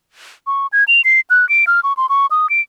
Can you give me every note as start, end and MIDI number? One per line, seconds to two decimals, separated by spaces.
0.47 0.67 85
0.73 0.84 92
0.88 1.01 101
1.04 1.20 96
1.30 1.48 90
1.49 1.65 98
1.67 1.80 89
1.83 1.93 85
1.97 2.06 84
2.09 2.26 85
2.31 2.49 87
2.50 2.61 98